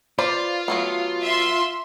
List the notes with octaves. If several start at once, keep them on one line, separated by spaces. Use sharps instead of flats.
F4 B4 C5 D5
F#3 A3 B3
E5 C6